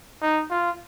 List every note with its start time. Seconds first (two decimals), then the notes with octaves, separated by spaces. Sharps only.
0.22 D#4
0.50 F4